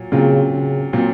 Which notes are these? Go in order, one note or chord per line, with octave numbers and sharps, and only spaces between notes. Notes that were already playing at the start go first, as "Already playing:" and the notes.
Already playing: A#2 F#3
A#2 C#3 F#3 C4 F4
C#3
A#2 F#3 C4 F4